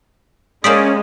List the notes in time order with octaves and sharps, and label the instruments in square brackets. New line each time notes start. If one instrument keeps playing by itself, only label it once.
[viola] G#3 [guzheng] A#3 C5 D5 [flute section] C#4 [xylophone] D#6 B6